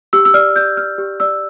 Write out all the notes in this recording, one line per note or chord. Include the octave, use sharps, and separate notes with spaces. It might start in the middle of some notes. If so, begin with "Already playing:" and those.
G4 E6
E6
D5 F6
D5 G6
G4 F6
G4
D5 E6